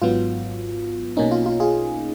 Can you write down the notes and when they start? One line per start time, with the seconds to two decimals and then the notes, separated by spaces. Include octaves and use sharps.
0.02 G#1 G#2 F#3 B3 F4
1.17 B1 B2 A#3 C#4 D#4
1.31 F4
1.46 F4
1.60 F4 G#4